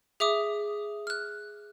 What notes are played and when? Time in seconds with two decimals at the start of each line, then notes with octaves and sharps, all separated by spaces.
0.20 G#4 E5 D6 D#6
1.07 F6 F#6